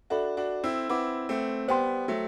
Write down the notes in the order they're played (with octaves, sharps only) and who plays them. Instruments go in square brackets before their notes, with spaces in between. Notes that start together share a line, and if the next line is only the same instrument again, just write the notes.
[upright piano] D4 F#4 [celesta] A4 E5 B5
[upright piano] D4 F#4
C4 E4
[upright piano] C4 E4 [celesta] B4 F#5 B5 D6
[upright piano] A3 C4
[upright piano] G3 B3 [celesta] C5 G5 C6
[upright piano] F#3 A3